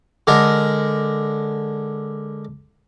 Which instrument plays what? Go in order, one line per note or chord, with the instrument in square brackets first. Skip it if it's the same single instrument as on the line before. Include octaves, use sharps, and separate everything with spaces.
[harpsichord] D3 G#3 A#4